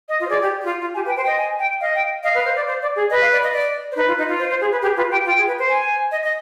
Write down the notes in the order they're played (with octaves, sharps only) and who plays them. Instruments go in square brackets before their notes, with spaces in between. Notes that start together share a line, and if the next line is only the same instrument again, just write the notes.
[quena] D#5
[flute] F4
[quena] C5
[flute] G#4 [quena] D5
[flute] G4
G4
F4
F4
[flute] G4 [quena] G#5
[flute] B4
[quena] G5
[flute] C5
[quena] G5
[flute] D#5
[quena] G#5
G5
[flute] D#5 [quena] F5
[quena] G5
[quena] D#5 [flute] F5
[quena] B4
C5
D5
C5
D5
G#4
[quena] B4 [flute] D#5
[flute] F5
D5
D#5
D5
[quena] C5
[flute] D#4 [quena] B4
[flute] F4
D#4
F4
[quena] C5
C5
G#4
B4
[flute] G4 [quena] G#4
[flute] F4 [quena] B4
[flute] G4 [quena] G5
[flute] F4 [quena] G5
[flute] G#4
B4
C5
[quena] G#5
[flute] D#5
D#5